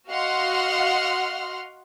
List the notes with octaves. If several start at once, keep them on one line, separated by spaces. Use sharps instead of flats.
F#4 D#5 F5 F#5 C6 F6